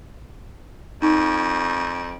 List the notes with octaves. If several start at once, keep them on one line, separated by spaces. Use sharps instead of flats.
F2 D#4